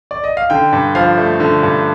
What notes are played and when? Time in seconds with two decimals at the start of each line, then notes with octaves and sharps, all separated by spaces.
0.11 D5
0.24 D#5
0.37 F5
0.50 D3 G5
0.72 G2
0.95 F3 F5
1.18 A3
1.40 D3
1.63 G2